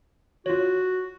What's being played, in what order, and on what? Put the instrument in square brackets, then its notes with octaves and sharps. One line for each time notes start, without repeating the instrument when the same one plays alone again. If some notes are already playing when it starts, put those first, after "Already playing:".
[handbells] F4 C#5 [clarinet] F#4